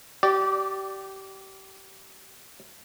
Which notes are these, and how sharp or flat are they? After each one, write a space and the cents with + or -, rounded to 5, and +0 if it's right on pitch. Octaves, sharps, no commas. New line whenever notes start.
G4 -25 D5 +0